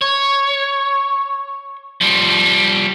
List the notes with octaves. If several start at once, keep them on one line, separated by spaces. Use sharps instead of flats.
C#5
F3 G3